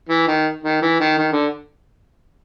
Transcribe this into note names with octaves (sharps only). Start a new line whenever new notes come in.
E3
D#3
D#3
E3
D#3
D#3
D3